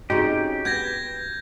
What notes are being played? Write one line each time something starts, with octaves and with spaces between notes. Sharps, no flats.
C#3 C4 D#4 F#4 G4 C#6
B3 D4 G6 G#6 A#6